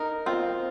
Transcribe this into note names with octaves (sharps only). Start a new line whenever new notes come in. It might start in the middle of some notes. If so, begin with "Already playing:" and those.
Already playing: D#4 A#4
C4 F4